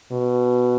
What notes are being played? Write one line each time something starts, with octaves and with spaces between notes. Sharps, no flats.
B2